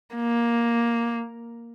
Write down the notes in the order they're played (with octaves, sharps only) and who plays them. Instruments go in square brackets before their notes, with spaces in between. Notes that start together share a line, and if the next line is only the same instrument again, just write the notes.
[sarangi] A#3